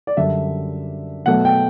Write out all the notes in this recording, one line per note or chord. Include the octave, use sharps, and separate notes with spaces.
D5
F#2 D3 G3 E5
B2 F#3 A3 F#5
G5